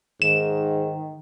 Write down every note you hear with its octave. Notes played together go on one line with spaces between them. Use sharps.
G#2 D#3 E7